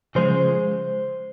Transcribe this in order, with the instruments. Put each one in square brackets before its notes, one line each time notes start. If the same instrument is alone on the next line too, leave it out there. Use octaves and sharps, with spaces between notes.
[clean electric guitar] C#3 F3 G#3 C5